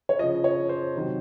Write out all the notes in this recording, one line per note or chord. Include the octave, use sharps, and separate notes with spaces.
C#5
C#3 F3 D#5
C#5
C5
C3 D#3 F#3